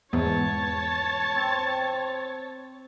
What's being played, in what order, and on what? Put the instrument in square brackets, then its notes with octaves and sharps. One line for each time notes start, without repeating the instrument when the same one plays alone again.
[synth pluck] E2 G#2 [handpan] B3 [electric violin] C#5 A5
[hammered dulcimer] C4